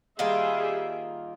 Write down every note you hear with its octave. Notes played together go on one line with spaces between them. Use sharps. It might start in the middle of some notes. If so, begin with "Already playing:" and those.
D#3 G3 A#3 F4 G#4 E5